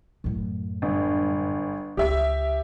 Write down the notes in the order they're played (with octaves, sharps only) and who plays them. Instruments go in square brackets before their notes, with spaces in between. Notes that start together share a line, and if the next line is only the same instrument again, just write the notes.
[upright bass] F#2 A2
[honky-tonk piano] G1
[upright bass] C#2 [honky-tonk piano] G4 E5